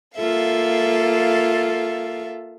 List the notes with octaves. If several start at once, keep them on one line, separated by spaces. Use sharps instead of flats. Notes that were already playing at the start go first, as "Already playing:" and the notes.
A#3 F4 A4 E5 F5